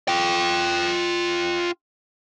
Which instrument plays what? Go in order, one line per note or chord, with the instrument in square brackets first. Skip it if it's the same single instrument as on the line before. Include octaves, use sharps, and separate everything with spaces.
[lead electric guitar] F4 G5